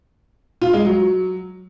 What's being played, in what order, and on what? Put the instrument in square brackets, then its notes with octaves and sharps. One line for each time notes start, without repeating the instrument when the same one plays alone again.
[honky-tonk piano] F4
G#3
F#3